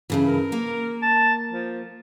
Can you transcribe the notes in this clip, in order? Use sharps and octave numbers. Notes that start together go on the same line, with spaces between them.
G2 C#3 E3
A#4
A#3
A5
F3